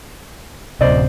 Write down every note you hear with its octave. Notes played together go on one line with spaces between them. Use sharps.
D1 C3 C5 D5 D#5